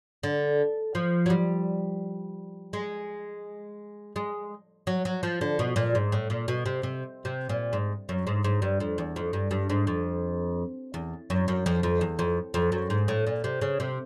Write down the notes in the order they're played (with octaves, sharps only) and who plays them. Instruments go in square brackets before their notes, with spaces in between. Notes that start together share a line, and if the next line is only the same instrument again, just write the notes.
[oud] D3
F3
F#3
G3
G#3
G#3
F#3
F#3
F3
D3
B2
A#2
G#2
A2
A#2
B2
C3
C3
C3
A#2
G#2
F#2
G#2
G#2
G2
F2
E2
F2
G2
G2
G#2
F2
E2
F#2
F#2
F2
F2
E2
F2
F2
F#2
G#2
A2
A#2
C3
C#3
C3